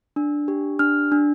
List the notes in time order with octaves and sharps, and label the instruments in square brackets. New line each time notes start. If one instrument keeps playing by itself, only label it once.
[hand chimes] D4
G4
D4 F6
D4